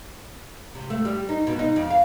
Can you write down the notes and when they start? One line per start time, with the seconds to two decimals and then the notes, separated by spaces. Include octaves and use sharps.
0.75 C3
0.90 A3
1.05 G3
1.29 D#4
1.47 B2
1.59 D#4
1.76 F2
1.90 F5